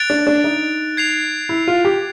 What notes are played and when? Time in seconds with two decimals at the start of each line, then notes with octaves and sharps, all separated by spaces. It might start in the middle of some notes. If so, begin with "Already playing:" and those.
Already playing: F#6 A6 D7 F7
0.10 D4
0.27 D4
0.44 D#4
0.97 G#6 C7 F7
1.49 E4
1.68 F4
1.85 G4